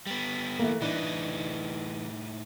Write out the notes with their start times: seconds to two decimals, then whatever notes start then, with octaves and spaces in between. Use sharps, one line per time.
0.06 G3 B3
0.59 E3 A3 A#3
0.81 A2 E3 D4 D#4